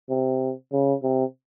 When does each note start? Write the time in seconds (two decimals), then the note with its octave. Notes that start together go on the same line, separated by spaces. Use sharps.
0.09 C3
0.72 C#3
1.03 C3